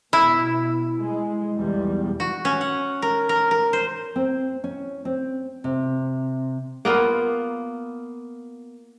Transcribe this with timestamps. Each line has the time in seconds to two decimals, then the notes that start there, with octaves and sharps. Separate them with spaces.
0.13 B2 E4
1.01 G#3
1.57 B1 E2 G3
2.20 F#4
2.45 C#4
2.61 F#5
3.02 A#4
3.29 A#4
3.51 A#4
3.73 C5
4.16 C4
4.64 C#4
5.05 C4
5.64 C3
6.85 A#3 B3 F4